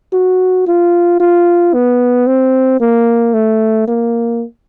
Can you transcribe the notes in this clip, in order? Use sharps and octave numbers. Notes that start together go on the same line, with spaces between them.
F#4
F4
F4
B3
C4
A#3
A3
A#3